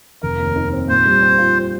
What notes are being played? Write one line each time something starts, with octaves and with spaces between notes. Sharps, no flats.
F1 A#4
D#2
D#3
C4
A#2 C5
G3
C4
F4